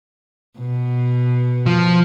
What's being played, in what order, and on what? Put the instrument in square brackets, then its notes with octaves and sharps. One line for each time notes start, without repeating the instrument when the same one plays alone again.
[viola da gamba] B2
[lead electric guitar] F3